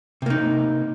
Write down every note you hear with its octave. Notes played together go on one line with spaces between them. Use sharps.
C3 A#3 D#4